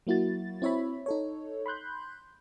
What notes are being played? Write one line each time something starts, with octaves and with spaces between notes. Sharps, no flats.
F#3 A#3 E4 F#4 A6
C4 E4 C#5 E5 B5
D#4 A4 C#5
B5 C6 F#6 G6